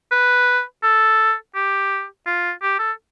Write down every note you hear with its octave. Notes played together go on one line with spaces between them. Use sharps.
B4
A4
G4
F4
G4
A4